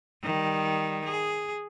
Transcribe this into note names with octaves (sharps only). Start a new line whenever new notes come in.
D#3 G3
G#4